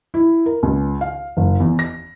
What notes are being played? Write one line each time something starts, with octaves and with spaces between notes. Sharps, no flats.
E4
A#4
C#2
F5
F#1
E2
A#6